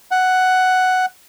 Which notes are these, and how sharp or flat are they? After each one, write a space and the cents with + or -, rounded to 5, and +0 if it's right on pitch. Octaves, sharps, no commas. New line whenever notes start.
F#5 +5